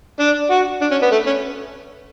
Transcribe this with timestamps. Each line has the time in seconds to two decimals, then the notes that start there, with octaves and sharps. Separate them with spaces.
0.20 D4
0.51 F#4
0.81 D4
0.91 C#4
1.02 B3
1.12 A3
1.26 C#4